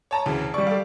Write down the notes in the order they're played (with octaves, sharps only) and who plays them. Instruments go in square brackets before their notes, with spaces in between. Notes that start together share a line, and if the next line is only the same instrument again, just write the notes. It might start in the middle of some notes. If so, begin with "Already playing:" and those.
[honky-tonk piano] C#5 A5 A#5
D2 C#3 E3
[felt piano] G3 D5 [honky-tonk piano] C#6
[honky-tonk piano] A4 F5